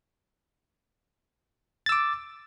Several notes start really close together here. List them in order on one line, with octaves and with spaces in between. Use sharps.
A6 E6 D6